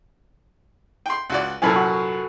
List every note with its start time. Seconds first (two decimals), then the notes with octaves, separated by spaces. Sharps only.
1.06 G5 C6
1.30 C#2 F#4 D5
1.62 C2 F#2 A#2 A4 B4 G#5
1.76 F#4